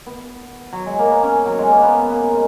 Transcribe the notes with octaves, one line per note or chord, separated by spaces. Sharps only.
B3
F#3
G#3
A#3
B3
C#4
F#3
G#3
A#3
B3
A#3
G#3